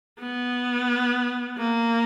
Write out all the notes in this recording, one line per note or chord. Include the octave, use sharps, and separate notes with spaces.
B3
A#3